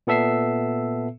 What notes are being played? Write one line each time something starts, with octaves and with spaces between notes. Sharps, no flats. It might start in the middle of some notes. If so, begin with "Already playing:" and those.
A#2 B3 A4 E5 E6 C7